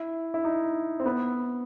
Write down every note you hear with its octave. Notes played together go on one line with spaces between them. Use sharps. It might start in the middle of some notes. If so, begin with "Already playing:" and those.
Already playing: E4
E4
D#4
C4
B3